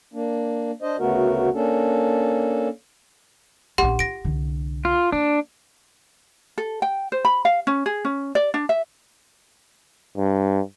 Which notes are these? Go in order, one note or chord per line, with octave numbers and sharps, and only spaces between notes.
A#3 D4
D4 C5 D#5
D2 C#3 A3 B3 F#4 A#4
A#3 C#4 D4 A4
A#1 B3 G4 F#5 C6
F4 A#6 D7
C2 D3
F4
A#3 D4
A4
G5
C5
B5
F5
C#4
G#4
C#4
D5
D4
E5
G2